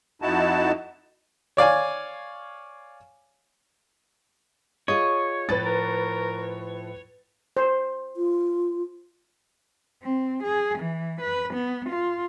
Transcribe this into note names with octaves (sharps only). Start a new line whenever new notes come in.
F2 D#4 E4 F#4 A5
C#5 D5 F5 G#5
F4 G#4 C#5 D#5
A2 F3 B4 A6
A#4
C5
F4
C4
G#4
E3
B4
B3
F4